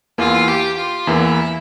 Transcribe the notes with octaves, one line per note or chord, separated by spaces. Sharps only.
E2 E3 A#3 F4
G4
F4
E2 E3 A#3 E4